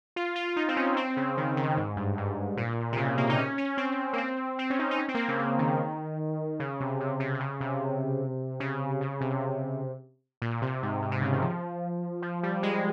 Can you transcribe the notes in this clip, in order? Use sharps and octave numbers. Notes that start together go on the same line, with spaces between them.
F4
F4
F4
D#4
C4
C#4
C4
C#3
D#3
C#3
G#2
G2
G#2
A#2
C3
C#3
A#3
D#4
C#4
C#4
C4
A#3
C4
C4
C#4
D#4
D#4
C#4
C4
A#3
C4
C#3
C#3
D#3
C#3
C3
C3
C3
C3
C#3
C3
C#3
C#3
C3
A#2
C3
G#2
G#2
C3
C#3
D#3
F3
F3
G3
G#3